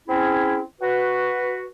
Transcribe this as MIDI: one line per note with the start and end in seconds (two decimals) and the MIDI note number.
0.08 0.61 60
0.08 0.61 61
0.08 0.61 64
0.08 0.61 68
0.80 1.67 66
0.80 1.67 71